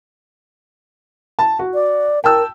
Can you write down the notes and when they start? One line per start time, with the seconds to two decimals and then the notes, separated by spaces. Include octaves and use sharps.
1.39 A5
1.59 F#4
1.74 D5
2.24 A#4 G5 A5 E6